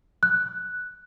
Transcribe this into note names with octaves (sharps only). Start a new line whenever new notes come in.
F#6